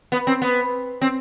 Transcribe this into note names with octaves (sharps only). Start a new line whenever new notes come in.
B3
C4
B3
C4